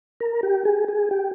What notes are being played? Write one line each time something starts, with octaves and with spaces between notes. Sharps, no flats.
A#4
G4
G#4
G#4
G4